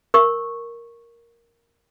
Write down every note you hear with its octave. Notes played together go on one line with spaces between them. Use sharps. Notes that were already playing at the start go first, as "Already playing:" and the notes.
A#4 C#6